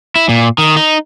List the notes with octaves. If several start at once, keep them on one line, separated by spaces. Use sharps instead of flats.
E4
A#2
D#3
D#4